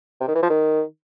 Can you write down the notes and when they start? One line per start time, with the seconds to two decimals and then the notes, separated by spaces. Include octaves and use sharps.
0.21 C3
0.28 D#3
0.35 E3
0.43 F3
0.50 D#3